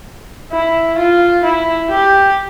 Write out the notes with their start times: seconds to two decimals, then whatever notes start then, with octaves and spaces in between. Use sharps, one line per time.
0.52 E4
0.98 F4
1.44 E4
1.90 G4